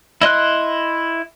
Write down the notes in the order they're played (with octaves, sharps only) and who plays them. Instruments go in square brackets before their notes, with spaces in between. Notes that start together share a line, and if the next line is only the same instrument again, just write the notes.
[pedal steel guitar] E4 D#5 C6 F#6